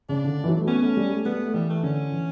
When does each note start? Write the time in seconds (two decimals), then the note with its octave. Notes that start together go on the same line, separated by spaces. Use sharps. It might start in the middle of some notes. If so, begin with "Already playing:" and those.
0.09 C#3 D4
0.24 D3
0.44 E3
0.48 F#3
0.57 A3
0.67 B3 C#4
0.82 A3
0.97 G3
1.10 A3
1.25 G3 B3
1.35 A3
1.45 A3
1.54 E3 G3
1.70 A3
1.83 D3 C#4
2.12 E3